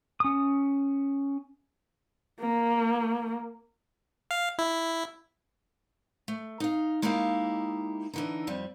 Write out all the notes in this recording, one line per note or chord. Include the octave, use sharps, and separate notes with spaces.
C#4 D#6
A#3
F5
E4
A3
D#4 F5
G#3 A#3 D#4 E4 G4 F5
D3 E3 D#4
F2 G3